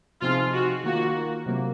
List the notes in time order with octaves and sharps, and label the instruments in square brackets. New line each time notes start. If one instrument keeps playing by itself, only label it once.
[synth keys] C3 F3 C4 D#4 G#4 [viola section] F4
[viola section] F#4
[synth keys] D#3 A#3 F4 [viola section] F#4
[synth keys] C3 F#3 A#3